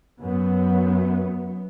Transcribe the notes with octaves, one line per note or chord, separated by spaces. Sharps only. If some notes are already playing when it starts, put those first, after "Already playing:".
F#2 B3